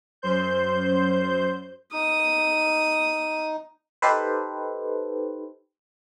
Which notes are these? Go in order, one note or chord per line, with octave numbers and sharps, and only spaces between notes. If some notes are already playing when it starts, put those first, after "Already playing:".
F#2 C5 G6
D#4 D#6
D#4 G4 A4 B4 C5